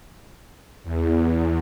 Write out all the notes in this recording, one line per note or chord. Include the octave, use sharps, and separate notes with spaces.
E2